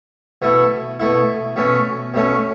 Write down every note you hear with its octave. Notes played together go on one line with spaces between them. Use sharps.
B2 A3 E4
B2 A3 E4
B2 A3 C#4
B2 A3 C#4